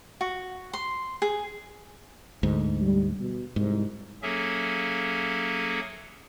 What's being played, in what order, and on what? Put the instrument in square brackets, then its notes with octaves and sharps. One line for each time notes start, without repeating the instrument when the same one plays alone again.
[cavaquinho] F#4
C6
G#4
[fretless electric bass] D2 G#2
[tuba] G3
B2
[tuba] C2 [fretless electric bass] G#2
[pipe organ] F#3 A#3 C#4 G#4 A4 E5